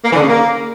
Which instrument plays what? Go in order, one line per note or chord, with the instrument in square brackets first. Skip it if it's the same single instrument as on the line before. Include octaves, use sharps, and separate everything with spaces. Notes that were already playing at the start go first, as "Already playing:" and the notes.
[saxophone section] A#3
E3
D3
C#3
A#3